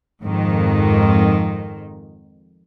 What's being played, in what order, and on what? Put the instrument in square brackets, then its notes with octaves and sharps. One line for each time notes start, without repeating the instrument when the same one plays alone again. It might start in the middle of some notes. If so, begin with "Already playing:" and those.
[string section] F2 G#2 D#3